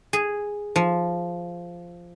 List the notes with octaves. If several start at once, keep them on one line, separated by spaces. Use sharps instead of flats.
G#4
F3